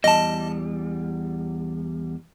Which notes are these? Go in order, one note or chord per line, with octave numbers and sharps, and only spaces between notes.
E2 G3 D#5 A5